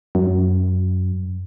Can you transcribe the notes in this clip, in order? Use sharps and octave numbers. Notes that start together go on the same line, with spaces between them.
F#2